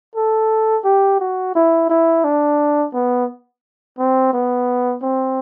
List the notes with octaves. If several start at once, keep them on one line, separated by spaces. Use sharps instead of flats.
A4
G4
F#4
E4
E4
D4
B3
C4
B3
C4